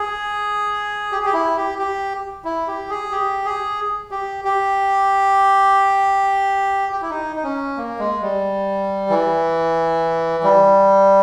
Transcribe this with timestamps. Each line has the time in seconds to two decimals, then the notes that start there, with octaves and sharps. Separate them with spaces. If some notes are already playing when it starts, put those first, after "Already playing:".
Already playing: G#4
1.12 G4
1.19 G#4
1.25 G4
1.33 E4
1.57 G4
1.78 G4
2.45 E4
2.67 G4
2.90 G#4
3.11 G4
3.45 G#4
4.11 G4
4.45 G4
6.92 G4
7.02 E4
7.10 D#4
7.36 D#4
7.44 C#4
7.77 A#3
7.99 G#3
8.21 G3
9.10 E3
10.43 G3